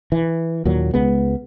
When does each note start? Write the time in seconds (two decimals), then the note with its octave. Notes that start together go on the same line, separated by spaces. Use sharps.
0.12 E3
0.65 D#2 A#2 F#3
0.94 C#2 G#3 B3